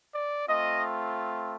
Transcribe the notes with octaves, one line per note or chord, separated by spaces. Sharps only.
D5
A3 C4 F4 D#5